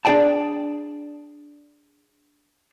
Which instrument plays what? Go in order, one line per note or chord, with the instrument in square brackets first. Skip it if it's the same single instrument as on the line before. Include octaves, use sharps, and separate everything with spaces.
[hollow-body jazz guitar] D4 G#4 D5 G5 A5